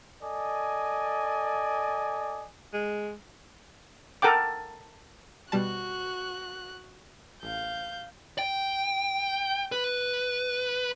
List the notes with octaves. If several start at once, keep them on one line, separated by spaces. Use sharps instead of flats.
A4 D5 D#5 G#5
G#3
A4 A#4 F#5 G5 D6
B2 G3 F#4 A5 F#6
A1 F5 G6
G5
B4